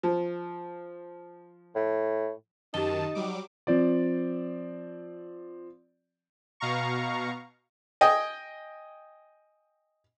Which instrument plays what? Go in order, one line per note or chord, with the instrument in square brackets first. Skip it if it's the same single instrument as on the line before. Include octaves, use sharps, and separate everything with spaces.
[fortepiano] F3
[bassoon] A2
[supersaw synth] F#2 D#3 A5 [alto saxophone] D#4 [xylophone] G4 G7
[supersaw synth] F#3 G3 D6
[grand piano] F3 C4 D5
[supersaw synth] B2 F5 A#5 C#6
[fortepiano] D#5 G5 G#5 D#6